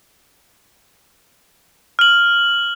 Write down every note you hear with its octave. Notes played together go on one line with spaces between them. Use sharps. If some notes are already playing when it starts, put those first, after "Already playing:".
F6 F#7